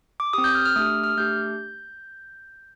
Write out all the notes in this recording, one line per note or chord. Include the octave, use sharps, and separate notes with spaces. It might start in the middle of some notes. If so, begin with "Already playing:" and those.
D6
C4 G4 D#6
G6
F6
F6
A3 D4 G4 D#6
D#6
F6
A3 D4 G4 G6